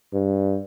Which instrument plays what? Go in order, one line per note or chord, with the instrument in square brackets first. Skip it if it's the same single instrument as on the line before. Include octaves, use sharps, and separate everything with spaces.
[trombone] G2